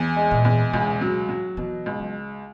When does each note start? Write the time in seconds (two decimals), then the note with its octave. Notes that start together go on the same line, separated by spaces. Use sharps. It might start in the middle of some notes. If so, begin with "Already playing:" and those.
Already playing: E2
0.16 G#3
0.31 A#2
0.45 E2
0.73 C#2 B2
1.01 F#3
1.29 F#3
1.57 B2 E3
1.86 C#2
1.99 F#3